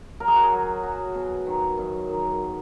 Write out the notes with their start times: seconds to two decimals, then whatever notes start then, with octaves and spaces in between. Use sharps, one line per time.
0.20 F#3 A#4
0.28 G#4
0.36 F#4
0.43 G#4
0.52 F#3
0.83 F#3
1.15 B2
1.46 D#3
1.78 F#2
2.09 D#3